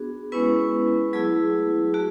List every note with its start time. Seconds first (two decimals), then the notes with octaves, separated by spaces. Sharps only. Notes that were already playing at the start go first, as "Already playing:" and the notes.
Already playing: B3 D4 F#4 G#4
0.32 G#3 B3 C#4 E4 B4
1.13 F#3 A3 E4 G#4
1.94 A3 F#4